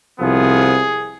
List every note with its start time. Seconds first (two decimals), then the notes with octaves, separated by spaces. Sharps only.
0.20 C2 C3 F3 B3 G#4